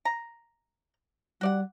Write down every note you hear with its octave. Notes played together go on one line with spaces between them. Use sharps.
A#5
G3 F#4 D5 F#5